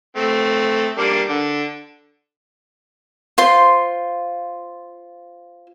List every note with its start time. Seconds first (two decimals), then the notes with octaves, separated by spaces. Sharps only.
0.17 A3 C4
0.98 G3 A#3 D4
1.28 D3
3.38 F4 C5 C6